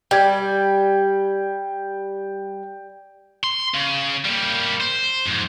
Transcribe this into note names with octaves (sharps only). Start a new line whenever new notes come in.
G3 G5 G#6
C6
C#3
G3 A#3
C5
F2 G#2